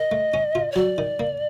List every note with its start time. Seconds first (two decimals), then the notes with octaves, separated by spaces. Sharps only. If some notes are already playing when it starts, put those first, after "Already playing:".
Already playing: A#4 D#5
0.12 A3
0.34 C#4
0.55 F4
0.72 C#5
0.76 F#3 D5
0.98 D#3
1.20 A#3